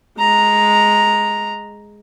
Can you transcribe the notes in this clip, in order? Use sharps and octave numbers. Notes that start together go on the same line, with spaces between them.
G#3 A#5